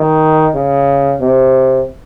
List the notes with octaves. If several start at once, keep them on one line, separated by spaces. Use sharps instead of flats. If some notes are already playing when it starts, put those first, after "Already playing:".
Already playing: D#3
C#3
C3